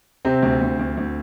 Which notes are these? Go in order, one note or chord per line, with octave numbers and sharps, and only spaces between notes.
C3 C4
D2
D2
D2
D2